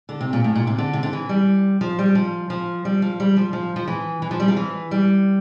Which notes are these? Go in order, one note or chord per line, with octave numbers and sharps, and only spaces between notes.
D3
C3
A#2
A2
A#2
C3
D3
C3
D3
E3
G3
F3
G3
F3
F3
G3
F3
G3
F3
F3
F3
E3
E3
F3
G3
F3
E3
G3